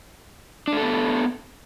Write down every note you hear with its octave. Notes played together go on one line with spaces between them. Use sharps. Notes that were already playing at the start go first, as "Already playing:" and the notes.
A3 B3 D4 A4